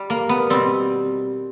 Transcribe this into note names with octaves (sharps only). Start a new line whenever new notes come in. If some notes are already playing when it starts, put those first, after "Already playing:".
Already playing: G3
A#3
B3
B2 G3 C4